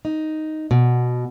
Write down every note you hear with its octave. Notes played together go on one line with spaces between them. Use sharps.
D#4
B2